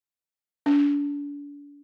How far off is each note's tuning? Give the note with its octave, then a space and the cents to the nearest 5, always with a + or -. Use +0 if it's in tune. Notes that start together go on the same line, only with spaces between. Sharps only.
D4 -40